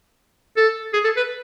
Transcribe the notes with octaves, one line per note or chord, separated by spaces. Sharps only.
A4
G#4
A4
B4